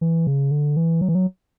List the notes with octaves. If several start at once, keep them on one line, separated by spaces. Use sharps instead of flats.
E3
C#3
D3
E3
F#3
E3
F#3